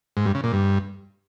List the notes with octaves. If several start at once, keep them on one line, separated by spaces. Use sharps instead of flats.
G#2
G2
C#3
A#2
G2